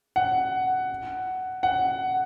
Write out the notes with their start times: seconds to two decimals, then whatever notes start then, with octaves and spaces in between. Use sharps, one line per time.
0.16 F#5
1.63 F#5